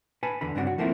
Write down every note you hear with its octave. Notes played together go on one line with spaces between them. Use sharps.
B4 G#5 A5
E2 D3 B5
G2 C#3 C4 D4 E4 F#4
F#4
F3 A3 A#3 C4 E4